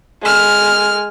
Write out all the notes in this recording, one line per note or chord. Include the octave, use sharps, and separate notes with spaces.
G#3 F6